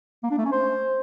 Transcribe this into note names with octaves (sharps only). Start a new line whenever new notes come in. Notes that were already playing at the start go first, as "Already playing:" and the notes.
A#3
D4
A3
C#4
C5